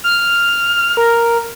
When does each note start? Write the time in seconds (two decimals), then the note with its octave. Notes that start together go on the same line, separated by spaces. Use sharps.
0.04 F6
0.97 A#4